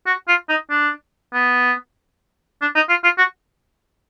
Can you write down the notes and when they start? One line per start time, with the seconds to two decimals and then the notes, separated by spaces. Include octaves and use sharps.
0.06 F#4
0.28 F4
0.49 D#4
0.70 D4
1.34 B3
2.62 D4
2.75 D#4
2.89 F4
3.04 F4
3.18 F#4